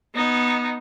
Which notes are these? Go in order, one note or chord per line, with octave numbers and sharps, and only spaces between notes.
B3 D#4